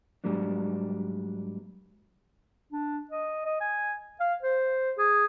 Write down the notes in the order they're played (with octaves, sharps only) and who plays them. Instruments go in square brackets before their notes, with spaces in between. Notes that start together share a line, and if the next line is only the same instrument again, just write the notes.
[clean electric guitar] G#2 F#3 G3 A#3 D4
[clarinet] D4
D#5
D#5
G#5
F5
C5
G#4